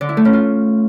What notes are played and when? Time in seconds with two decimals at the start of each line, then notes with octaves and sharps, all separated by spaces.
0.01 D3
0.09 E4
0.17 A3
0.25 C#4
0.33 F4